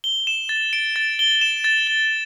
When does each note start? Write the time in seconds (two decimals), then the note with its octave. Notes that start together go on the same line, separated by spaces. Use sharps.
0.04 G7
0.27 E7
0.49 A6
0.73 D7
0.96 A6
1.19 G7
1.41 E7
1.64 A6
1.87 G7